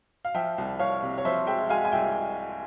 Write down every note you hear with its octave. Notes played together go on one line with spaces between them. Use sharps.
F5
F3 E5 G5
C2
C2 C#5 F5
C3
C#5
F3 C5 E5
G#3 E5 G5
G#3 F5 G#5
G#5
C2 E5 G5